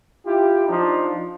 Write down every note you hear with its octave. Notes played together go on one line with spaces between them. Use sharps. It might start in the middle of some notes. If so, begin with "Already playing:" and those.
E4 F4 G4
F3 D4 D#4